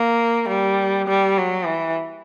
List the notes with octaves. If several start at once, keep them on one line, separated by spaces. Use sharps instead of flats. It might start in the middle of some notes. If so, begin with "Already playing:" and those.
Already playing: A#3
G3
G3
F#3
E3